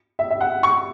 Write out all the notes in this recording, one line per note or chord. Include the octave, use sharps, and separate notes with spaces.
E5
E5
F#5
C#6